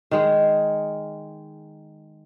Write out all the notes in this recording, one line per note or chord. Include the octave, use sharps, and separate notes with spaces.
D#3 G#3 G#4